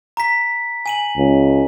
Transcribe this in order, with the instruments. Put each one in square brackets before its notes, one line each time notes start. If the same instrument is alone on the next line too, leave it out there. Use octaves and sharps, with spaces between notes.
[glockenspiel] A#5 B6
G#5 D#7 F#7
[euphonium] C#2